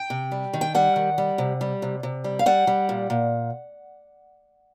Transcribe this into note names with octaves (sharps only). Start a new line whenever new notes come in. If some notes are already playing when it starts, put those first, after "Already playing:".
Already playing: G5
C3
G3
D#3
G5
G3 F#5
D#3
G3
C3
G3
C3
C3
G3
F5
G3 F#5
G3
A#2
A#2